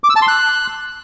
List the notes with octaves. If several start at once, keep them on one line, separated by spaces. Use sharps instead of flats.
D6
E6
A5
C6
F#6